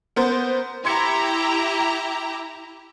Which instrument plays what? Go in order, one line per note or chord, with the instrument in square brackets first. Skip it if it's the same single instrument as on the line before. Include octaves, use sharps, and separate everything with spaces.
[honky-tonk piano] B3 A#4 C5
[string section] E4 G4 A#5 [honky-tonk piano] C6 G#6 C#7